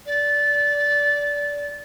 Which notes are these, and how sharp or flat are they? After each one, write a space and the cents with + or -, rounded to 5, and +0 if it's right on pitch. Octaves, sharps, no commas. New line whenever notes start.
D5 -20